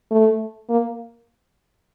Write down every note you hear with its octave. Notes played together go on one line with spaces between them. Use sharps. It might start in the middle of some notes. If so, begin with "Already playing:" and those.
A3
A#3